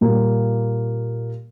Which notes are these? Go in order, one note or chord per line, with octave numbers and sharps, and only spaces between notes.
A#2 G3 A#3